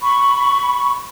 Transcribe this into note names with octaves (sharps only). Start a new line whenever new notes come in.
B5 C#6